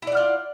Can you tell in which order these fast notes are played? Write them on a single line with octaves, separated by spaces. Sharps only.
E4 D5 F#5 F4